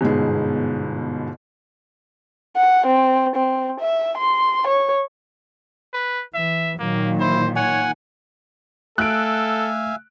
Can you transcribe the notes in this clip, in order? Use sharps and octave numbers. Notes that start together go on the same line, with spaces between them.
G1 G#2 B2 G#4
F#5
C4
C4
E5
C6
C#5
B4
E3 E5
A#2 D#3 F#3 A#3
E4 C5
C#5 F#5 G#5
A3 A4 E5 F5 G#5 F#6 D7